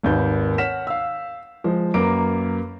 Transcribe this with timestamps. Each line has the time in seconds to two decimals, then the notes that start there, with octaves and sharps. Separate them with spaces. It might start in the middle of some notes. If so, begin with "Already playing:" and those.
0.03 G#1 D#2 B4 G6
0.58 C#5 F#5 F6 B6 E7
0.87 F5 E6
1.64 F3 G#3
1.94 F#2 A#3 B4 A#5 D6 D7